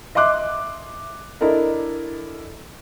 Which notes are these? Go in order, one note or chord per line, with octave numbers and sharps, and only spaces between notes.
D#5 E5 C6 D6 F#6
D4 E4 A4 A#4 D#5